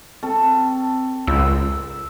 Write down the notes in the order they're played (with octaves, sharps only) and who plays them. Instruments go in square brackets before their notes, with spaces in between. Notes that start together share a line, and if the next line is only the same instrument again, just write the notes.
[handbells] C4 [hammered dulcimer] A4
[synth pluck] C#2 [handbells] E6